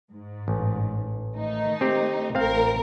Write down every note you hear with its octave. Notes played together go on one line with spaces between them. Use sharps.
G#2
A1
D#3 A3 D#4
C4 G4
A1 A2 C4 A#4 F5